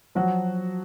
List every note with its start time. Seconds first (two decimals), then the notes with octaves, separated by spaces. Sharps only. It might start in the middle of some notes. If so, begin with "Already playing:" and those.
0.15 F3 F#3 F#4